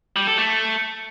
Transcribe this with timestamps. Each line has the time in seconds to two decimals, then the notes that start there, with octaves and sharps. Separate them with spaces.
0.16 G3
0.27 A4
0.38 A3